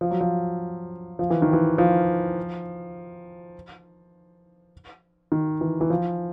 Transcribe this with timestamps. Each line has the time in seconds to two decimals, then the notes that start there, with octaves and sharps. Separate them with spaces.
0.01 F3
0.11 F#3
0.21 F3
1.19 F3
1.30 E3
1.42 D#3
1.53 E3
1.78 F3
5.32 D#3
5.61 E3
5.81 E3
5.90 F3